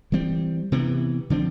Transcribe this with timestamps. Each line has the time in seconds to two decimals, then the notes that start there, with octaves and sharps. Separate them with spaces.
0.12 E3 G3 C4
0.72 C3 E3 B3
1.30 D3 F3 C4